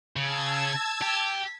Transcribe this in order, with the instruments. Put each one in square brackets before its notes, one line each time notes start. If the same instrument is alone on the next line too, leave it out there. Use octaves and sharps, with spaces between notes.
[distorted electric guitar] C#3 [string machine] A5 E6 G#6
[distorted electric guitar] G4